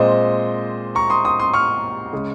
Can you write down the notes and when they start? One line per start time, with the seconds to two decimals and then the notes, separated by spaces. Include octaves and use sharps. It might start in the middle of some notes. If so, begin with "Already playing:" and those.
Already playing: A#2 G#3 C4 C5 D#5
0.95 A#5 C#6
1.10 C6 D#6
1.25 C6 D#6
1.40 C6 D#6
1.54 C#6 F6
2.13 C#3 G#3